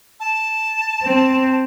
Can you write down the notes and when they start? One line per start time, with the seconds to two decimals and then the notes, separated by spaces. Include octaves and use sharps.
0.20 A5
1.03 C4